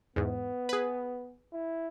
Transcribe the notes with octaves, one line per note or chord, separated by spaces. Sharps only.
E2 G#2 B3
G#4 B4
E4